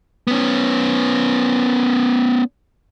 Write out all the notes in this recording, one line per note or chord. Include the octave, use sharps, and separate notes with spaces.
B3 C#4